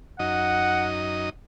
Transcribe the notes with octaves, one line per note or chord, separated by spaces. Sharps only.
F#2 D#4 D#5 F#5